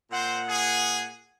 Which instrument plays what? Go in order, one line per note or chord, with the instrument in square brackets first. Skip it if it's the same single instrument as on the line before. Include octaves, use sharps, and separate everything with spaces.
[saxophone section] A#2 F#5 [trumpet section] C4 C5
[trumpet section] G#4